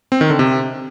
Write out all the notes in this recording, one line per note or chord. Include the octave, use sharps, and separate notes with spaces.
C4
D#3
D3
C3